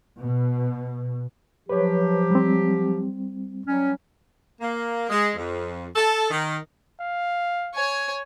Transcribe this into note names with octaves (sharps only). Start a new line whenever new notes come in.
B2
F3 F#3 G4 B4 C#5
G3 C4
F#3 G3 C#4
A#3
G#3
F2
A4
D#3
F5
C#5 G#5